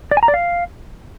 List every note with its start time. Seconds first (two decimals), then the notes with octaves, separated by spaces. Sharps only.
0.11 D5
0.17 G#5
0.23 A#5
0.28 D5
0.34 F5